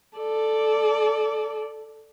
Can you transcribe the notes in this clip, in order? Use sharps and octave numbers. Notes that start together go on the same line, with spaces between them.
A4 D5